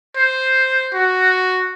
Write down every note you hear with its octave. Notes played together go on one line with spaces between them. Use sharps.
C5
F#4